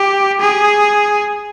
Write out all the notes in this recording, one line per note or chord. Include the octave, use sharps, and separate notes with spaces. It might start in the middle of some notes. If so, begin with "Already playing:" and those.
Already playing: G4
G#4